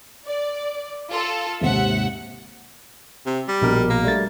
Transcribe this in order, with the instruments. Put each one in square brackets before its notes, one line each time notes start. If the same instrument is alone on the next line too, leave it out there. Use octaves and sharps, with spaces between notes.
[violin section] D5
F4 A4
[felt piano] D#2 G#2 C3 [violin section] E5 F#5
[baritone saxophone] C3
G3
[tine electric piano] A#1 B2 A#4
[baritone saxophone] A#3
[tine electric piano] G3 A3 A6